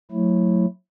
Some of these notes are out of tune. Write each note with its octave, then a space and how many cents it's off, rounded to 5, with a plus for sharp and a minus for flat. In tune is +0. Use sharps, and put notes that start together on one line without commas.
F#3 -25 A3 +5 E4 +0